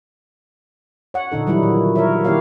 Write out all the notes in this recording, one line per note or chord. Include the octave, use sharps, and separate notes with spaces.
C#5 F#5
A#2 D3 D#4 A4
D#3 E3 F#3 G3 D#4 E4
A#2
A#4 C#5 E5
D#3 A#3 E4 G4 C#5 F5